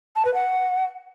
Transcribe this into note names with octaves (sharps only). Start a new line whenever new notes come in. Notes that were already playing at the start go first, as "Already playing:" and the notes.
A5
B4
F#5